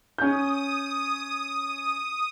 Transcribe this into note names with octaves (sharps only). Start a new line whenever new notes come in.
C#4 D#6 G6